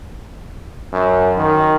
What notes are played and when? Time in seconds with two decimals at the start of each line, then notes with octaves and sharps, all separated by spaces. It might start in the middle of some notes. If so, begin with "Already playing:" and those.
0.93 F#2
1.38 D#3